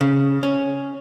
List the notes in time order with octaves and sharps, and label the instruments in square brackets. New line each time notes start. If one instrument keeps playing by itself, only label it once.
[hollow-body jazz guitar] C#3
C#4